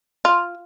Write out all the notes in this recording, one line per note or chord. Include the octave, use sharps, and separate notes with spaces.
F4